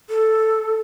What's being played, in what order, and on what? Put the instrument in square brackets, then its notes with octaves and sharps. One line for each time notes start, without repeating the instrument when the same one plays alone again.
[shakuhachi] A4